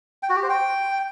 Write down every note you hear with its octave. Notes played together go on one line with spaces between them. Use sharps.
G5
F#4
G4
C5
G5